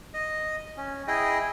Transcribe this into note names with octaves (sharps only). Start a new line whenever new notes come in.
D#5
C#4
E4 G#4 D#5 G5